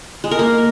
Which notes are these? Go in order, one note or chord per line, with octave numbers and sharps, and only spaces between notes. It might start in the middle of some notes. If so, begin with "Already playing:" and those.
G#3
A#4
A#3